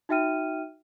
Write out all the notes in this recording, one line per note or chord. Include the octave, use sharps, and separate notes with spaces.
D#4 F#4 E5 G5 F6 D#7